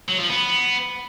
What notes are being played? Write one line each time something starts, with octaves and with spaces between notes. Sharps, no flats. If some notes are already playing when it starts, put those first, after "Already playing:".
F#3
F3
B3